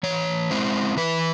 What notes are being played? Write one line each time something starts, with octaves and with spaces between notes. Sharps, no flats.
E3 C#5
G#3 C4 E4 C5
E3 B4